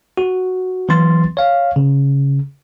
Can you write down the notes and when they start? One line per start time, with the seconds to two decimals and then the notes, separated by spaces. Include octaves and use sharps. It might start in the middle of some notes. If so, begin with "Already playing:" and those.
0.17 F#4
0.89 E3 F#3 B3 C6 A6
1.37 C#5 F5
1.76 C#3